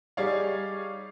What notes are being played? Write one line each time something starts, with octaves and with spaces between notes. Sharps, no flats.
G3 D#4 G#4 C#5 D5 F5